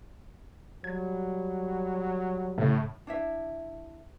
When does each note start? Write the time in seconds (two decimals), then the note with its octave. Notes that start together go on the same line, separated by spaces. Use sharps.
0.84 F#3 G3 G#6
2.58 A2 C#3
3.07 D4 E4 E5